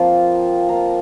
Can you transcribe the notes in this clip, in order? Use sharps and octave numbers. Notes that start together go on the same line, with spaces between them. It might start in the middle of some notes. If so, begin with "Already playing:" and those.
Already playing: F3 A#3 C4 F4
A#3 F4 A#5